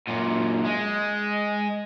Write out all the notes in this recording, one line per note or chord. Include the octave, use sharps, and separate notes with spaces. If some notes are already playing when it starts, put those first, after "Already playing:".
F#2 A#2
G#3